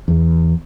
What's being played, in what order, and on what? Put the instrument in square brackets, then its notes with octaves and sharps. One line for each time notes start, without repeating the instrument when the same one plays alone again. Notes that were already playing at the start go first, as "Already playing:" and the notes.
[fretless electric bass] E2